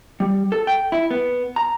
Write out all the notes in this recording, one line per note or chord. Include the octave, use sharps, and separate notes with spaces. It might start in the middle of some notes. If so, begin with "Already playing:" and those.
G3
A4
G5
E4
B3
A#5